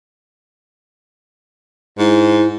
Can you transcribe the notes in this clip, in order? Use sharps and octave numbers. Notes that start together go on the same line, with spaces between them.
G#2 E4